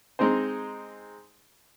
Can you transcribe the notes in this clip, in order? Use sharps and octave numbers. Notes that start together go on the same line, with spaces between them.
G#3 C4 D#4 G#4 C5